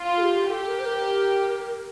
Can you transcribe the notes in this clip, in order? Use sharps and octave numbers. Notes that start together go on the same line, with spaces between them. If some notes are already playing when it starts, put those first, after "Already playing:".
Already playing: F4
A4
G4
G4 A4
A#4
C5
A#4